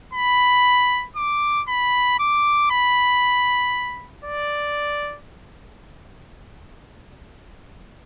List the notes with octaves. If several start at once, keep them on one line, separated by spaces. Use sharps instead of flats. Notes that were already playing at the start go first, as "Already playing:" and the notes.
B5
D6
B5
D6
B5
D5